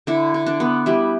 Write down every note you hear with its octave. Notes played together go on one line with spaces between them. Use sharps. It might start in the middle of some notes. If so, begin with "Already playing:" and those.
D3 E4
D3
D4
B3
G3 E4